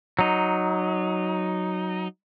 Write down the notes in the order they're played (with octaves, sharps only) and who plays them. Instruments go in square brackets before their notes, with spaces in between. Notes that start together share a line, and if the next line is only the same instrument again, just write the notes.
[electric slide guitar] F#3 D#4